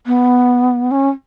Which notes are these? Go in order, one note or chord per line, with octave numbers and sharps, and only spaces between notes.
B3
C#4